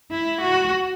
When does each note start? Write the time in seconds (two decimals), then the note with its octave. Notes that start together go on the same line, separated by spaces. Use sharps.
0.11 E4
0.41 F#4